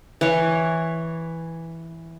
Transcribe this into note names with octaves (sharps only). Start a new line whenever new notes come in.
E3 C#5